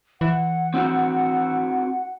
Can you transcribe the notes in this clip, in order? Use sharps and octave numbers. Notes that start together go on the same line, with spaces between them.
E3 F#5
C4 E4 F#4